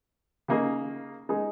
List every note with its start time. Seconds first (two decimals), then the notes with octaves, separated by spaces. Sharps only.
0.48 C#3 A#3 D#4 G#4
1.29 G#3 D#4 G#4